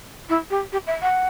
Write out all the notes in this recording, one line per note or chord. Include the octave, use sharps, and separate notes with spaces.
E4
G4
G4
E5
F#5